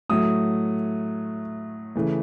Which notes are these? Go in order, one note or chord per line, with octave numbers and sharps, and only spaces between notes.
A2 F#3 A3 D#6
C#3 E3 A3